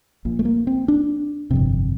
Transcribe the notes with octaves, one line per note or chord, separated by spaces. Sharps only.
A#1 A#2
A3
A#3
C4
D4
G1 F2 C3